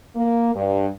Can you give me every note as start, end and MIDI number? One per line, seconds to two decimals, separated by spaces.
0.16 0.50 58
0.55 0.89 43